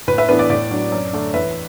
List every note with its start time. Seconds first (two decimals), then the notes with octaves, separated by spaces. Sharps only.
0.08 A2 B4
0.18 B4 E5
0.29 E3 B3 D4 B4
0.39 D5
0.50 A2 D5
0.71 F#3 D4
0.92 F#2
1.13 D3 A3 D4
1.34 E2 B4 E5